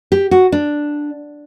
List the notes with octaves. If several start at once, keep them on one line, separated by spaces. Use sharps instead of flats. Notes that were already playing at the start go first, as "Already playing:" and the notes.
G4
F#4
D4